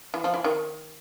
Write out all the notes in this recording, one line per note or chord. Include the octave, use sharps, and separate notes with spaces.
E3
F3
E3
D#3